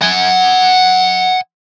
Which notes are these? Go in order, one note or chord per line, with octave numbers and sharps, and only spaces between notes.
F#5 G#5